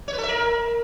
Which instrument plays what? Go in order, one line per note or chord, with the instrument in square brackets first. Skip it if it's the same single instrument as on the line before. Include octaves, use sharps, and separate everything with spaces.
[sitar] C#5
B4
A4
E5
A#4